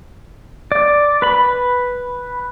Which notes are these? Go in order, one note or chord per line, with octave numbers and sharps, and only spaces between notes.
D5
B4 B5